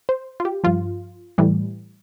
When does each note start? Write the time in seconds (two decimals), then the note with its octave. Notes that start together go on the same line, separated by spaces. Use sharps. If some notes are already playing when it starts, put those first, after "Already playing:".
0.09 C5
0.40 F4
0.45 G4
0.64 G2 F3 F4
1.38 A2 E3 G3